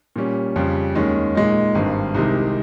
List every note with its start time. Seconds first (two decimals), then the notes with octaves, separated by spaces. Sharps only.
0.16 A#2 G3 C#4
0.56 F2 C#3 G3
0.95 D#2 D#3 G#3 C#4
1.35 A#2 G#3 D#4
1.75 G#1 G2 D#3
2.14 C2 C3 D#3 G#3